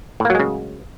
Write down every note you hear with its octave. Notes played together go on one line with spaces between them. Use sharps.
A2 C#3 F#3 G#3 A#3